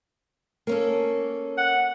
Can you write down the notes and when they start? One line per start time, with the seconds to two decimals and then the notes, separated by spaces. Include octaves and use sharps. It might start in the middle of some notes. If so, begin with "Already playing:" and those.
0.67 A#3 C#4 A4
1.58 F#5